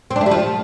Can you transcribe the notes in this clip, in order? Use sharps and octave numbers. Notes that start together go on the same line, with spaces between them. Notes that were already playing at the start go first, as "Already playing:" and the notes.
C4
D4
A3
G3
F3